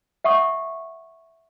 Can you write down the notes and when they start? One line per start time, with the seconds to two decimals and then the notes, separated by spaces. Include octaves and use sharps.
0.24 E5 F#5 C#6 D#6